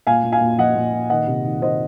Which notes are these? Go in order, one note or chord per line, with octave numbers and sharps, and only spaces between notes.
A#2 F5 G#5
A#2
F5 G#5
A#2
F3 D#5 F#5
A#2
A#2
D#3 D#5 F#5
C3
D#3
D#3 C5 D#5